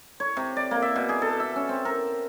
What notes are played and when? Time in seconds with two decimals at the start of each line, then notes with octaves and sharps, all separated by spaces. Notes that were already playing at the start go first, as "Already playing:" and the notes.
0.20 C#5
0.37 C3
0.57 D5
0.71 A#3
0.82 E5
0.96 B2
1.09 G#4
1.22 A4
1.40 E5
1.56 C#4
1.69 C4
1.85 A#4